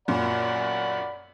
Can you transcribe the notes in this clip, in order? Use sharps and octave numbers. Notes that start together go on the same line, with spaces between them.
F#2 A#2 D5 F#5 B5